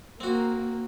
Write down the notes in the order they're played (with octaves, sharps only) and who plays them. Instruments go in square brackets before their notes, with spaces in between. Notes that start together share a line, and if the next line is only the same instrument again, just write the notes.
[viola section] A#3 [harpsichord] C4 F#4